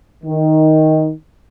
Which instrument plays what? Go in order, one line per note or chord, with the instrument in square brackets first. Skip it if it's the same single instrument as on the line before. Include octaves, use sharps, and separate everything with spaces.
[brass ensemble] D#3